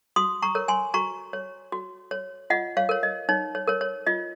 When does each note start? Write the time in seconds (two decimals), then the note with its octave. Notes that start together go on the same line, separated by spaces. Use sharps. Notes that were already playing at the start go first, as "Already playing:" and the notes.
0.16 F#4 C6 D#6
0.42 A#5 C#6
0.55 A#4 C#5
0.68 G#5 C6
0.94 F#4 A#5 C#6
1.33 C#5
1.72 F#4
2.11 C#5
2.50 F4 D#5 F#5
2.77 C#5 F5
2.89 A#4 C#5
3.03 D#5
3.29 D#4 C#5
3.55 C#5
3.68 A#4 C#5
3.81 C#5
4.06 F4 D#5